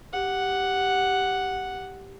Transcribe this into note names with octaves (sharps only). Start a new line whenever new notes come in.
G4 F#5